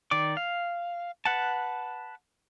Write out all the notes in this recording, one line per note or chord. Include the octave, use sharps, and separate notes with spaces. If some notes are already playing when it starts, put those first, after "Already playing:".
D#3 D5 D6
F5
B4 F#5 A5